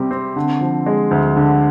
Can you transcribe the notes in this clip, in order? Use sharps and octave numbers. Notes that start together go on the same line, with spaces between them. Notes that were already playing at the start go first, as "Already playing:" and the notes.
Already playing: C3 G3 C4 G4
C4
D3
F3
G#3
D2
D3